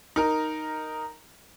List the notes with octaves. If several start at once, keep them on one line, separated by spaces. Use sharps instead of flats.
D#4 A#4